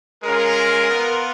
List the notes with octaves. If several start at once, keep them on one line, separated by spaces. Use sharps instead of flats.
G#3 C#4 F4 A#4
B3 F4